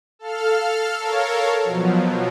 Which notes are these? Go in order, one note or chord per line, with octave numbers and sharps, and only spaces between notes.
A4 F5 F6
A4 A#4 C#5 F5
B2 F3 F#3